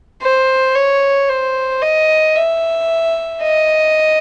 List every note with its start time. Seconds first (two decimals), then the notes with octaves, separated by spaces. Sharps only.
0.22 C5
0.75 C#5
1.29 C5
1.82 D#5
2.36 E5
3.43 D#5